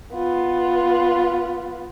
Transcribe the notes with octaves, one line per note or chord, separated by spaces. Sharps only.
B3 F4